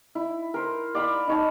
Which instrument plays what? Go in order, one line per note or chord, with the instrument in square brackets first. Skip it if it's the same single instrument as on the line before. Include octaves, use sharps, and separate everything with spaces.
[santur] E4
A#4 C5
D5 F5 B5 E6
D#4 C#5 A5